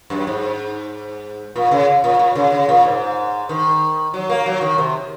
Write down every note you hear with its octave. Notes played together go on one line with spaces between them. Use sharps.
F#2
G#2
A#2
C#3
A#2
A#2
C#3
C#3
A#2
G#2
D#3
F#3
A#3
F#3
D#3
C3